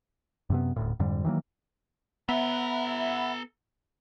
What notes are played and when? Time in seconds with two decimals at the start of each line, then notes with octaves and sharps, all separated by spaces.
0.50 F#2 C3 B3
0.76 D#1 D2 A2
1.00 F2 G#2 D3 G3
1.25 D#3 E3 F#3 A#3
2.29 B3 A4 E5 F#5 A#5 B5